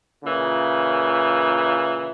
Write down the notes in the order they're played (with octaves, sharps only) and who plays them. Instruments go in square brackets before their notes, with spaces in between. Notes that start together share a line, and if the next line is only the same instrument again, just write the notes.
[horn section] A#2 C#3 E3